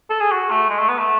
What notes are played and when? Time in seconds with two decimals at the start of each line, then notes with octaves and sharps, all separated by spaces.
0.10 A4
0.20 G#4
0.32 F#4
0.51 A3
0.70 G#3
0.79 A3
0.88 B3
0.98 A3